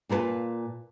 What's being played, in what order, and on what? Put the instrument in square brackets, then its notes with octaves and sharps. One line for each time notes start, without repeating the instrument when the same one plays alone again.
[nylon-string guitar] A#2 F4 A#4 B4 A5